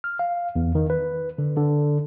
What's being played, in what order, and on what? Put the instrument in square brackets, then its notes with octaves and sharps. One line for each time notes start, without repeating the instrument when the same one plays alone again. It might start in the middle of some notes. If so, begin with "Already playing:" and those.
[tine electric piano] F6
F5
E2
D#3
B4
D3
D3